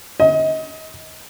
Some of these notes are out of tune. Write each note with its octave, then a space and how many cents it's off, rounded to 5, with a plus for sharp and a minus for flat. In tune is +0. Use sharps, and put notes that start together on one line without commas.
D#5 +30